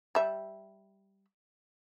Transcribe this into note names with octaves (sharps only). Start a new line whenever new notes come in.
G3 E5